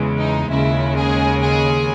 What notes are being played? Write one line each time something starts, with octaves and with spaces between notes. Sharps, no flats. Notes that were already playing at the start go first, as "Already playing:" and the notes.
Already playing: E2 C#3 E3 G#3
D#4
D#2 C#3 G#3 E4
G#4
G#4